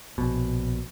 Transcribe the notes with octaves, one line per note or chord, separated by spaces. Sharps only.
A#1 B2